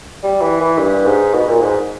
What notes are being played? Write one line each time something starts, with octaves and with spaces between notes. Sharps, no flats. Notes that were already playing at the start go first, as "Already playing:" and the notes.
G3
E3
E3
G2
G#2
B2
A#2
G#2